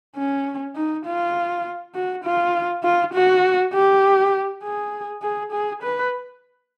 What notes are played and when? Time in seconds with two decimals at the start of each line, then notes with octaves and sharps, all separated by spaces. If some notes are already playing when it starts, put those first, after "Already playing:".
0.17 C#4
0.76 D#4
1.06 F4
1.95 F#4
2.24 F4
2.83 F4
3.14 F#4
3.74 G4
4.63 G#4
5.22 G#4
5.52 G#4
5.82 B4